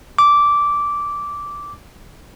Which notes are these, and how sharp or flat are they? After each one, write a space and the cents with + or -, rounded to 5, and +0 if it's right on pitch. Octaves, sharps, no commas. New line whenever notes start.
D6 -10